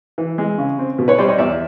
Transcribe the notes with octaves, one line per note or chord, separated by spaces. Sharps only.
E3
G#3
C#3
C4
B2
B4 C#5
G3 C5 D5
C#5 D#5
E2 D5 E5